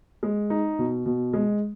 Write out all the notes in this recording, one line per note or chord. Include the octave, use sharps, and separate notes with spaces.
G#3
D#4
B2
B2
G#3